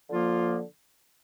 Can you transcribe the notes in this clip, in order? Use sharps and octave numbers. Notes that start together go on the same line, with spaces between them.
D3 F3 A#3 F4